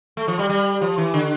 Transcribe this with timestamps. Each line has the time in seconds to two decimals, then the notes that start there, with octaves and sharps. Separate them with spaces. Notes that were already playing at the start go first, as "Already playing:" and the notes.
0.17 A3
0.28 F3
0.39 G3
0.49 G3
0.81 F3
0.98 E3
1.14 D3